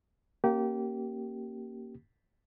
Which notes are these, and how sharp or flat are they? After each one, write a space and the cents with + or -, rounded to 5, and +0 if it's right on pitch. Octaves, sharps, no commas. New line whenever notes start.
A#3 +0 C#4 -20 G4 -25